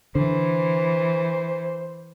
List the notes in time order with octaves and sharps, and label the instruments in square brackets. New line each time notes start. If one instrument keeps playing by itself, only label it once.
[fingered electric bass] D3 [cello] E3 [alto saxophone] C5